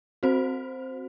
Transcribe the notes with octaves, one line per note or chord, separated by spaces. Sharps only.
C4 F#4 C5